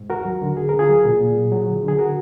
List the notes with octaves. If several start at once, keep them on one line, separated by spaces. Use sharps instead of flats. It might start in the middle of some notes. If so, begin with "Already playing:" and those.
Already playing: G#2
D#2 F#4 A#4
F#3
D3
D2 G#4
D2 A#4
F4 G#4
F#3
A#2
A#2
F#3
F#3
D3
D3
G#4
F#4 A#4